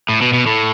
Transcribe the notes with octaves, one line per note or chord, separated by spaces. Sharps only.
A2
B2
B2
A2